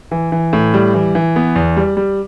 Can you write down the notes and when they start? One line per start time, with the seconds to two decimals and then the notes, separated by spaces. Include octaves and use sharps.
0.11 E3
0.32 E3
0.53 A2
0.74 G3
0.94 E3
1.15 E3
1.36 B3
1.56 E2
1.77 G3
1.97 G3